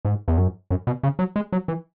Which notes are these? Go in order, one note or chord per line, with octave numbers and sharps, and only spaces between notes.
G#2
E2
F#2
F#2
B2
C#3
F#3
G#3
F#3
E3